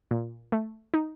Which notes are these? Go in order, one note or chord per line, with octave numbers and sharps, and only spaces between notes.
A#2
A3
D#4